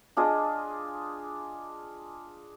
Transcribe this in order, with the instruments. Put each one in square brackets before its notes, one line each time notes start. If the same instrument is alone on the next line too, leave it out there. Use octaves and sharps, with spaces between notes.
[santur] D4 F4 G#4 D#5